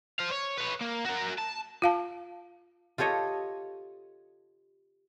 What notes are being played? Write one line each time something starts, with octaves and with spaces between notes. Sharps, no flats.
C5 F5
C#5
B4 C#5
A#3
F#4 A#4
A5
F4 F5 A5
F4 G4 A4 C#5 D#5